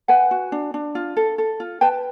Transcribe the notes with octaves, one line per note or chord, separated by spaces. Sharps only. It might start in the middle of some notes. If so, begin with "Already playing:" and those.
B4 F#5 G#5
F#4
D4
D4
F4
A4
A4
F4
B4 G5 A5